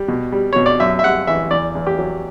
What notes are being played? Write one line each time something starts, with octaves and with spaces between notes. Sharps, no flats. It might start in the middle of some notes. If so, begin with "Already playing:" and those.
Already playing: G3
B2
G3
B2 C#5
D5
F#2 E5
E5
G3 F#5
E3 E5
E2 D5
E2
G4
F#3